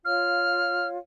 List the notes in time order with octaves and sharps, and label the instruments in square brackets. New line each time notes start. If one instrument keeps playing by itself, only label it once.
[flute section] F4 C#5 F5 [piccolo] F6